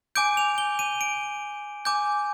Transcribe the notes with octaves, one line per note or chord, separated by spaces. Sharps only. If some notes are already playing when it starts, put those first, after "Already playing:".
G#5 D6 G6 D7
F7
G7
D#7
D7
G#5 D6 G6